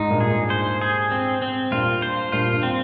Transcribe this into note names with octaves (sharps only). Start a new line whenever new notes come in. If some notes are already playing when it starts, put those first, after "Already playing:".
Already playing: G#2 D#4
G2 A#2
G#4
G#2
C5
G#4
C4
C4
G2 A#2 F4
C5
G2 A#2 F4
G2
C4